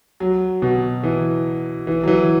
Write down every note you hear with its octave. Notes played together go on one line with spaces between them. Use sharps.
F#3
B2
E3
E3
F#3
E3